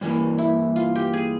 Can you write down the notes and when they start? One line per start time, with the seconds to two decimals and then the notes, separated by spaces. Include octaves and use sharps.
0.01 G2 E3 A#3 C#4
0.38 E4
0.76 F4
0.96 G4
1.14 G#4